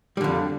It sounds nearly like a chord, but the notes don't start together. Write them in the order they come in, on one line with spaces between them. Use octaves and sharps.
G3 D3 F2